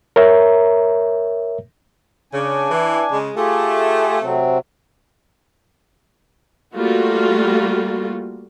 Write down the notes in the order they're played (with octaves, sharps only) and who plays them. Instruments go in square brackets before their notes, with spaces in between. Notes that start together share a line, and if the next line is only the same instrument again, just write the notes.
[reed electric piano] A#4 C#5 E5 A#5
[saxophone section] C#3 [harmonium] D4 G#5
[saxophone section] E3
C#3 G#3
[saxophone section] A3 [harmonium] F4 G4 G#4
[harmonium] C3 F#3 C4
[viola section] G3 A3 A#3 F4 F#4